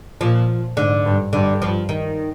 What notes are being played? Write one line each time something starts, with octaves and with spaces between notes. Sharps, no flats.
A#2 F3
G#2 D3
G2
G2 D3
F3
D#3